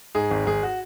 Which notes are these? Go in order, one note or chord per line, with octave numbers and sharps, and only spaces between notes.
G#2 G#4
G#1
G#1 G#4
F#4